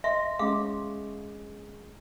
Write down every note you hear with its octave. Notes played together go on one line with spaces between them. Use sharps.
D#5 E5 C6
G#3 C#4 F5 C6 D6